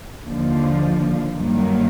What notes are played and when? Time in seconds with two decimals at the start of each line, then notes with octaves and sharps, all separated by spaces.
0.26 D#2 D3 F3
1.34 G2 D#3 F#3 A#3